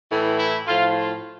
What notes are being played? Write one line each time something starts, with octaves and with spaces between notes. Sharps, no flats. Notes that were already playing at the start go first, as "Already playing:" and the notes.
A2 E3
E4
A2 F3 F4
F4